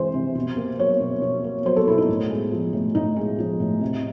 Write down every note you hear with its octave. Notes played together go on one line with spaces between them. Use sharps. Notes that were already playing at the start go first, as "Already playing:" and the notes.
Already playing: C3 E3 G#3 C5
C3
B2
A#3
F#3 C#5
B2
B2
A#3
F#3 C5
A4
B2 E4
D#4
A2
G#3
F3
A2
A2 D#4
G#3
F3
A2
C3